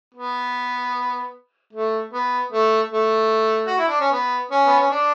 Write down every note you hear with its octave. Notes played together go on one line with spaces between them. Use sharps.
B3
A3
B3
A3
A3
F#4
E4
D4
C#4
B3
C#4
B3
C#4
D4